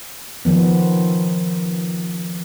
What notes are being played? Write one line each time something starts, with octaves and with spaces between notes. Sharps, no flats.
D#3 F3 B3